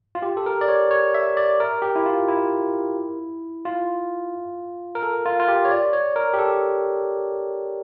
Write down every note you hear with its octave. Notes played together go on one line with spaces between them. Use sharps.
F4
G4
A4
A#4
D5
C#5
C#5
E5
D5
A#4
G4
E4
F4
E4
F4
A#4
A4
F4
F4
G4
C#5
D5
C#5
A#4
G4
A4